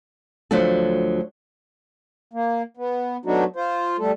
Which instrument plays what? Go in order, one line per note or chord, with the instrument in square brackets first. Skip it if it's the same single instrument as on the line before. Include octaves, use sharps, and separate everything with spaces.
[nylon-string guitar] D2 F3 F#3 A3 D4 A4
[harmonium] A#3
B3
F#3 A3 B3 D4 D#4 F#4
F4 C5
G3 A3 A4